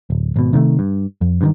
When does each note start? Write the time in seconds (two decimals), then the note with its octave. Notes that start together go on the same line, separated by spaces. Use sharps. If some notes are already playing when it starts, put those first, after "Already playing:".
0.10 D1
0.36 G#1 B2
0.53 C3 D#3 G#3 A3
0.79 G2
1.21 F2
1.41 G2 D3 D#3